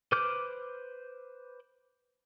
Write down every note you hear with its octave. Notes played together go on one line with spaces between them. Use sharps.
B4 C5 D6 F6 G6